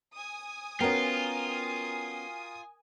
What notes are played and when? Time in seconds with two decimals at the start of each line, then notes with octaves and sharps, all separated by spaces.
0.14 G#5 D#6
0.80 B3 C#4 F4 F#4 A#4 G5